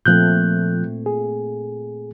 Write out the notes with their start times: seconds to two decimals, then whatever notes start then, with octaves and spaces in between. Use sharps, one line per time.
0.06 A#2 F3 A3 C4 F#6 G6
1.06 G#4